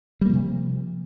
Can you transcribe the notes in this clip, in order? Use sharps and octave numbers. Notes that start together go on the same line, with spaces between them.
C3 F3 G3 A#3